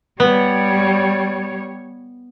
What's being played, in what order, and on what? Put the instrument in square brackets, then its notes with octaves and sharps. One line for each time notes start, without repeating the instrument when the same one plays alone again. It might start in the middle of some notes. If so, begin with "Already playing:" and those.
[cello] G3 C#5 [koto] B3